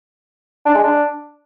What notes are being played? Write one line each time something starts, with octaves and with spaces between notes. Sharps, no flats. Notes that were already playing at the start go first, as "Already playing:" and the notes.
D4
G#3
D4